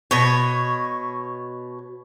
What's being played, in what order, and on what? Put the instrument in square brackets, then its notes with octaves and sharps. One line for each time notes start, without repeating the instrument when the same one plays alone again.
[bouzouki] B2 C#5